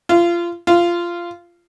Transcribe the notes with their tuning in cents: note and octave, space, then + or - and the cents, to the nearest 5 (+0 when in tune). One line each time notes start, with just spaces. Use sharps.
F4 -25
F4 -15